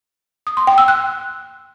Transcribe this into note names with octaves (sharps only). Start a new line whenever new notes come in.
D#6
C6
G5
E6
F#6